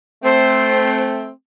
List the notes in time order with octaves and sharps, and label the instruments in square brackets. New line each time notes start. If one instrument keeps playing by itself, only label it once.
[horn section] A3 C4 [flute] C5